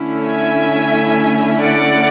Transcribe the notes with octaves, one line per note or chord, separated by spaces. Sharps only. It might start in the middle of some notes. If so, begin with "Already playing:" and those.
Already playing: D3 A3 C#4 E4
E5 G#5
D5 F#5